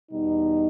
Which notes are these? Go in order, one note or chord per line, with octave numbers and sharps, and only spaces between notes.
E2 B2 G3 D#4